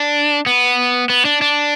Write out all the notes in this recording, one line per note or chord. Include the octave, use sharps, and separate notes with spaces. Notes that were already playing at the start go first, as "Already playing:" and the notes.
Already playing: D4
B3
B3
D4
D4